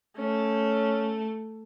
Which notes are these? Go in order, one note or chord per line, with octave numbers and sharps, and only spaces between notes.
A3 C#4